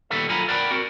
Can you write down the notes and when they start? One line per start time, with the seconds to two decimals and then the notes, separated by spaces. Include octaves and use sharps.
0.10 A#2 D#3 G3 B3 A4 E5
0.28 D3 F#3 F4 G#5 A#5 B5
0.48 A#4 D5 F#5 G5 A5 B5
0.70 C4 F#4 A#4